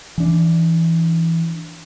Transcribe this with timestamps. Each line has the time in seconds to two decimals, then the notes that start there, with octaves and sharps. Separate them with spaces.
0.18 E3 D4